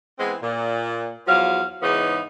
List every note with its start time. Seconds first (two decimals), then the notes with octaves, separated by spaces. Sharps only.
0.19 E3 G#3 B3 C4
0.42 A#2
1.27 E2 F3 F#3 F5
1.82 G#2 C#3 E3 B3 D#4